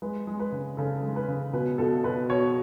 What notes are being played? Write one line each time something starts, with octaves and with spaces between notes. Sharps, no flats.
G#3 B4
G#3
B4
C#3
C#3 A4
G#3
B4
C#3
B2 B4
B2 A4
B2 B4
B2 C#5